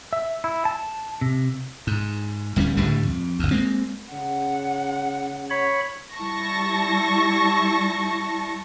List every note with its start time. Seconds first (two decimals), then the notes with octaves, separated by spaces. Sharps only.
0.13 E5
0.44 E4
0.65 A5
1.21 C3
1.87 G#2
2.56 D1 G3 A#3 C#4
2.77 C#2 A2 D3 G3
3.06 F2
3.39 G1 D2
3.51 G#3 A#3 C4
4.12 C#3 F#5
5.50 C#5 B5
6.15 G3 E4 A5 C#6 A#6